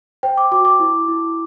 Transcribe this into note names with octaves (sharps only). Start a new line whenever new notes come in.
C5 G5
D6
F#4 D6
D6
E4
E4